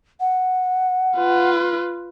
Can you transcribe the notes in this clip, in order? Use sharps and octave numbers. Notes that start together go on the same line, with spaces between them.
F#5
F4 B4